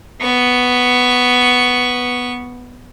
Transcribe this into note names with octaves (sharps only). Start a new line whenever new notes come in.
B3 C#6